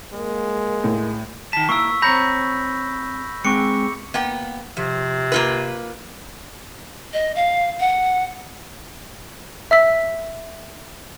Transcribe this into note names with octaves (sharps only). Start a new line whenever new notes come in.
G#3 A#3
A2
D#3 A5 B6
A#3 E4 C#6 E6
C4 C#5 A#5 B5 G6 A#6
G#3 C4 C#6 D6 C#7
A#3 B3 G5
C3 F3
A#3 F4 B4
D#5
F5
F#5
E5 E6 B6